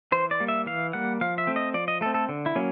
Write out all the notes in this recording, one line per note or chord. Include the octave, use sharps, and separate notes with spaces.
E3 C5
D5
G3 A#3
E5
E3 F5
G3 A#3 F#5
F3 F5
E5
A3 C4
D#5
F3 D5
D#5
A3 C4 A4
A4
D3
E4
F#3 A#3 C#4